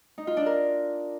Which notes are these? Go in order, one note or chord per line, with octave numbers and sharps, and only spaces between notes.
D#4
F4
D4
A#4